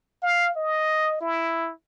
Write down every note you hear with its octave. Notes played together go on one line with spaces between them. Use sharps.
F5
D#5
E4